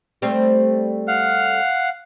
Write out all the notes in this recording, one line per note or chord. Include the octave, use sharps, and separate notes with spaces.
G3 A3 C4
F5 F#5 F6